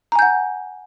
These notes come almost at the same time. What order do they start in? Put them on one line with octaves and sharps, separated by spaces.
A#5 G#5 G6 F#5